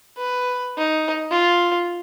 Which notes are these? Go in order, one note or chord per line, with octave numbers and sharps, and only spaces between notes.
B4
D#4
F4